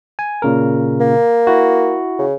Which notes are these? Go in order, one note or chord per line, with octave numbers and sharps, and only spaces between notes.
G#5
A#2 C#3 A#4
A#3
E4 F#4
C#3